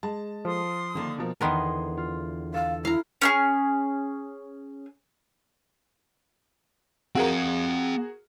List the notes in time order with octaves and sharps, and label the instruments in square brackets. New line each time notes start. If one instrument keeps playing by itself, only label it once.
[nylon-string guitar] G#3 [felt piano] A5
[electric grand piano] F3 [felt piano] A4 [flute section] C6 D#6
[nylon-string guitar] D3 A#3 [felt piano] D#3
[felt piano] B2 F3 A#3
[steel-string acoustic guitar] E2 D3 [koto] D#3 B3 A#4 [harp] G#4 C6
[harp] F4
[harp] A4 [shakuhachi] F5
[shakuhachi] E4 [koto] F5 A#5
[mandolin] C#4 D#4 G#4
[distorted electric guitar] C4 F5 [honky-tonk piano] F#4 G#4 A#4